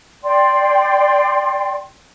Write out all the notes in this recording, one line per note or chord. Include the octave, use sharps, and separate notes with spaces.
D5 G5 C6